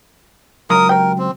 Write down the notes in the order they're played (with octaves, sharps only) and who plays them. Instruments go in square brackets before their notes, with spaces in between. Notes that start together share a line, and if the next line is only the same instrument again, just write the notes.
[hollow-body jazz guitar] C#2 F#3 A#5 [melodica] A#4 D#6
[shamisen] C4 G4 G5 [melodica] A#4
[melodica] C4